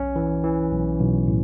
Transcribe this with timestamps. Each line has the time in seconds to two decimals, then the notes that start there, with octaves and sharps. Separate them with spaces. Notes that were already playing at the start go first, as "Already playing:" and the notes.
Already playing: B1 C#4
0.16 E3
0.44 E3
0.72 B1
1.00 B1
1.28 A2